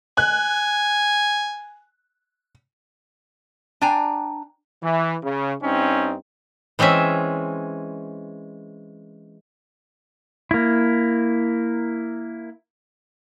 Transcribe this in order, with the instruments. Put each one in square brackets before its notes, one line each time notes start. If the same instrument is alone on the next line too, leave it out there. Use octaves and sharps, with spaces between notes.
[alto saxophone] G#5 [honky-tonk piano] F#6
[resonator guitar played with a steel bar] D4 G5 G#5 A#5
[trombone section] E3
C#3
G2 C4 C#4 D#4
[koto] E3 G#3 C4 C#4 E5
[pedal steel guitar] A#3 E4